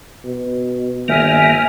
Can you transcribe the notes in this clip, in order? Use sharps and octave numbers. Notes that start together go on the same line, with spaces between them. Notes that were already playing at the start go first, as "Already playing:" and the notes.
B2
G1 D#3 A#3 E5 G#5 F6